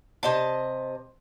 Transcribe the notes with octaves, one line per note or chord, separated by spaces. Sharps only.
C3 D#5 A5